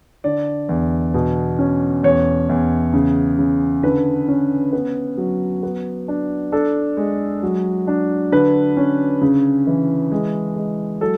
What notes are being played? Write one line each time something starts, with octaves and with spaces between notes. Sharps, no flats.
D3 D5
E2
B2
C#4
E2 C#5
E2
C#3
C#3
D3 B4
C#4
B3
F#3
B3
D4
D4 A4
G#3
F#3
D4
D3 B4
C#4
C#3
E3
G#3
G#3
F#3 A4